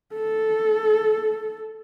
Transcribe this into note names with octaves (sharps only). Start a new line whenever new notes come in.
A4